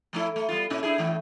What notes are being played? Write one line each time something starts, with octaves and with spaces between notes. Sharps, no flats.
F3 A3 E4
A3
G3 B3 F4
A#2 C#4 E4
D4 E4 G#4
A2 E3 A3